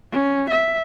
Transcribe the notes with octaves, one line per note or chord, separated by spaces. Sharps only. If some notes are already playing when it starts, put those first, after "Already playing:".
C#4
E5